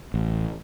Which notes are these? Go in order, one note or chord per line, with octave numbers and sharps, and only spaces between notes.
A1